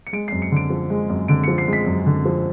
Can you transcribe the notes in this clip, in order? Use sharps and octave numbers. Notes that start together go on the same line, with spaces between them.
C#7
G#3 D7
C7
F#2
C#7
D3 D7
F3
G#3
F#2
D3 D7
C#7
F3
C7
G#3 B6
F#2
D3
F3